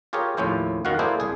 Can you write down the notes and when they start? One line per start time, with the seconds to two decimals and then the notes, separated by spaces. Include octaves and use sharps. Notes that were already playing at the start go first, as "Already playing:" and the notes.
0.13 F4 G4 G#4 A#4 C#5
0.37 D#2 A2 F3 C#4 E4 C5
0.85 F#2 D#3 F#4 F5 F#5
0.99 A#3 E4 G#4 A4 C5 D5
1.20 C2 G#4